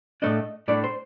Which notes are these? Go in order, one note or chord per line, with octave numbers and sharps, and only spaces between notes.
A2 A3 D4 D#5
A2 A3 D4 D5
C5